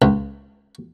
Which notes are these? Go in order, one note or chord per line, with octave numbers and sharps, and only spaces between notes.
C#2